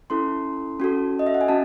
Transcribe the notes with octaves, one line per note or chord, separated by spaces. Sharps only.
C#4 E4 A4 C6
C#4 F#4 A4
D#5
E5
F#5
G#5
C#4 F#4 A5